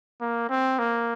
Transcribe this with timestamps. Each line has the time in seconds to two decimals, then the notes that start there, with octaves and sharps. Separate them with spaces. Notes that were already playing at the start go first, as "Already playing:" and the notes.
0.21 A#3
0.50 C4
0.79 A#3